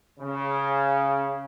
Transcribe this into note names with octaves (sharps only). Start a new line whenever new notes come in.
C#3